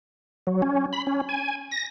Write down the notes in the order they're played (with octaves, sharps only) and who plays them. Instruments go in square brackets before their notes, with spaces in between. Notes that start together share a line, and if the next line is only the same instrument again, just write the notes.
[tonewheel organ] F#3
C#4
B5
C#4
G#5
A#6